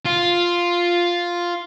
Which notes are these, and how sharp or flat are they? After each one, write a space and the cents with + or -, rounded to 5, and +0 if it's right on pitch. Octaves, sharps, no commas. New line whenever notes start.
F4 +0